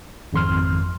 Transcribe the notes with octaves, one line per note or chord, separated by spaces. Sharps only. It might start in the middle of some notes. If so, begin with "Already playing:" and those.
G#1 F2 C6 F6